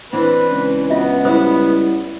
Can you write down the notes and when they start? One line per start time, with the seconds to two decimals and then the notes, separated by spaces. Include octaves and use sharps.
0.13 E3 C4 D4 B4
0.52 C#2
0.90 B3 F4 D#5 E5
1.25 G3 E4 F4 C5 D#6